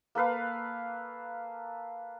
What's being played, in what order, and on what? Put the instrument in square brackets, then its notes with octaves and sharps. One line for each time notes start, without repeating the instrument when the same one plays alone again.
[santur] A#3 A4 B4 F5